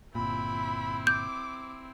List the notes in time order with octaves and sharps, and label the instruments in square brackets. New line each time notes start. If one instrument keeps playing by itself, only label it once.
[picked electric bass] G1 A#2 [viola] C4 E4 [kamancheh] B5
[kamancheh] D6 [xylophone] G6